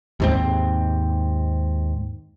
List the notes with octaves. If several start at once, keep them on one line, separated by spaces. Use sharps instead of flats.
D#2 G#2 C4